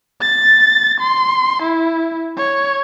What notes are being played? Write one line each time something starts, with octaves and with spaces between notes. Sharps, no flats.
A6
C6
E4
C#5